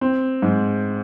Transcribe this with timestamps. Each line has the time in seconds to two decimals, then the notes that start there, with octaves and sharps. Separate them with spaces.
0.01 C4
0.42 G#2